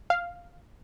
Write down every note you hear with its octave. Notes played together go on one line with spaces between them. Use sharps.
F5